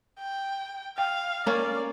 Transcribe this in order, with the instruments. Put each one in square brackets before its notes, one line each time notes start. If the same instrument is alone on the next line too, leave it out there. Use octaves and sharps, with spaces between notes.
[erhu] G5
[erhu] F5 [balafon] G5
[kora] A#3 C#4 [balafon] C#5 [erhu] D5